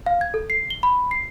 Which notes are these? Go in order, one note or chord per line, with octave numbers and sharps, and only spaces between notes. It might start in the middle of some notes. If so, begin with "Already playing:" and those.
F5
G#6
A4
C7
G7
B5
C7